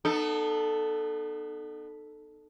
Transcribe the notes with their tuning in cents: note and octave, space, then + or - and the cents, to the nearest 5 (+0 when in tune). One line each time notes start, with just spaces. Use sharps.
B3 +0 D#4 -40 A4 +0